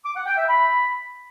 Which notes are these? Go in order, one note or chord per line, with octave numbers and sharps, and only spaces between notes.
D6
F#5
G5
E5
B5